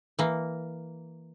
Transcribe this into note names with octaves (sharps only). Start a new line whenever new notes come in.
E3 A#3